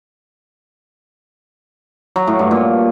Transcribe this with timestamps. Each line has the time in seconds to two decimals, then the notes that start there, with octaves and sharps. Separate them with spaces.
2.16 F#3
2.27 A2
2.39 G2
2.51 A#2